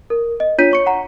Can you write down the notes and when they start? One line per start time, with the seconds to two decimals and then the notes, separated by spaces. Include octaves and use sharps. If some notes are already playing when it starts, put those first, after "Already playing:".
0.10 A#4
0.40 D#5
0.58 D4 F4 C#5 G6 B6 D#7
0.71 C#5 C#6 C#7
0.86 F#5 A#5